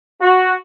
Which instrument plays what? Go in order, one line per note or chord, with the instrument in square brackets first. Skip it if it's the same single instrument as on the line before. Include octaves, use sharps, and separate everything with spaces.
[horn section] F#4